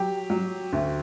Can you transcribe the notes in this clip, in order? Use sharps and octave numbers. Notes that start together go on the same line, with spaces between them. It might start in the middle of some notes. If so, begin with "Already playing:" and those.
Already playing: F#3 G4
F#3
D2